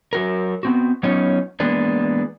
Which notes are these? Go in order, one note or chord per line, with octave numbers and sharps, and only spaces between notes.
F#3 F#4 A#4
B3 C4 F#4
F#3 B3 C#4 D#4 F4 C#5
E3 G#3 A#3 B3 D4